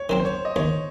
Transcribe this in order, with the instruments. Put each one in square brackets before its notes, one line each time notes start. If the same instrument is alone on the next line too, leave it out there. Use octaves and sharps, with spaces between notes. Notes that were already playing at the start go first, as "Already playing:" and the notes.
Already playing: [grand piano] C#5
[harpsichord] D#3 F#3 C4
[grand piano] C5
C#5
D#5
[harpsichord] D#2 [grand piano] C#5